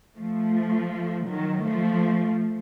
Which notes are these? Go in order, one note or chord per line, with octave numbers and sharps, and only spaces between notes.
F3 A3
D#3 F#3
F3 A3